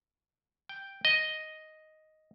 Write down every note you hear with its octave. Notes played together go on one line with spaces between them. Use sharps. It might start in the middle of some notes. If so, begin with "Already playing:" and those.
G5
D#5